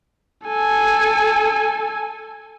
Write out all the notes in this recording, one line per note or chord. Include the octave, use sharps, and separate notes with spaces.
A4 G#5